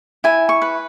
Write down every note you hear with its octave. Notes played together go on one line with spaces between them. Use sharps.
E4 G#5
C#6
B4